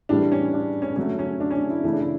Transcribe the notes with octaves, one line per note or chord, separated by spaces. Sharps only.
A2 E3 G3 D4
C#4
D4
C#4
D3 F#3 A3 C#4
C#4
D4
C#4
D4
E4
C#3 E3 A3 E4
D4
E4